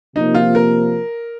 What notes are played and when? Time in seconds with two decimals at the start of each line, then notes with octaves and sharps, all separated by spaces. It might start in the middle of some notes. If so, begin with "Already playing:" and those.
0.15 C3 F3 A#3 D#4
0.35 F4
0.55 A#4